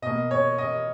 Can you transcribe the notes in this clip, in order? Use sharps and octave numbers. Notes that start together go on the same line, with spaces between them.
B2 A#3 D#5
C#5
D#5